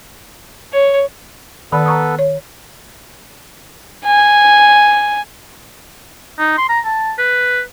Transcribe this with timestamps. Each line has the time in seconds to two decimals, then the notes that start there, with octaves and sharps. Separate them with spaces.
0.72 C#5
1.72 D#3 B3 A4 B4 D5 B5
1.86 A#5 C#6 D#6
2.19 C#5
4.06 G#5
6.39 D#4
6.58 C6
6.69 A#5
6.85 A5
7.18 B4